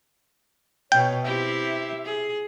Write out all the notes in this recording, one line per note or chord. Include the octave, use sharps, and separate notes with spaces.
B2 C#5 G5
C4 E4 G4 E5
G#4